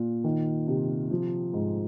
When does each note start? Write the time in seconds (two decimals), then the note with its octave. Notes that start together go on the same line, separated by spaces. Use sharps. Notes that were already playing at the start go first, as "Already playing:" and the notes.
Already playing: A#2
0.24 D#3
0.67 C3
1.11 F3
1.53 G#2